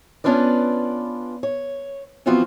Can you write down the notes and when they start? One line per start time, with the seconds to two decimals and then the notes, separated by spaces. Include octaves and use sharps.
0.24 B3 C#4 D4 F4 B4 D5
1.43 C#5
2.26 E3 F3 B3 C4 F4 F#4